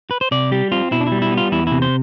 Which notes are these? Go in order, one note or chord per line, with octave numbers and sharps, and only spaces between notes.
B4
C5
C3 D5
G3 G4
C4 F4
B2 E4
D4
E4
G3
E4
B3
F4
E2 E4
C3 E4
C5